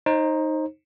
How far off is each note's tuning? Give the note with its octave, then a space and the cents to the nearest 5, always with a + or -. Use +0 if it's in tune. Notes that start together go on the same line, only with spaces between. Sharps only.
D#4 +0 C5 +30